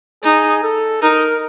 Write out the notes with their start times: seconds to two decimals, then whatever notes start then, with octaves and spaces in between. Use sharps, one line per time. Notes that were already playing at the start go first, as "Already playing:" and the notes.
0.23 D#4 G#4
0.63 A4
1.02 D#4 A#4